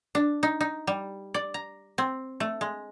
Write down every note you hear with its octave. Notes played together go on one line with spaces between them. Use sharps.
D4
D#4
D#4
G3
D5
A#5
C4
A3
G#3